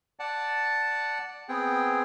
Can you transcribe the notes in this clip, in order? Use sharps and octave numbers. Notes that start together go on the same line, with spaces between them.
D5 F#5 A5
B3 C4 G#4 G5